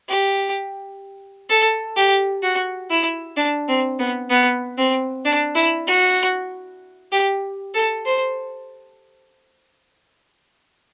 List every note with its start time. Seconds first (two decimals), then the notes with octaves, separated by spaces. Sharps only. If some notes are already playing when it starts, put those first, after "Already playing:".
0.09 G4
1.50 A4
1.96 G4
2.43 F#4
2.90 E4
3.37 D4
3.68 C4
3.99 B3
4.30 B3
4.78 C4
5.25 D4
5.55 E4
5.87 F#4
7.12 G4
7.74 A4
8.05 C5